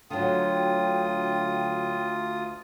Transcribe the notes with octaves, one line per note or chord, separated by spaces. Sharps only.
D2 D3 F#3 F4 G5 D#6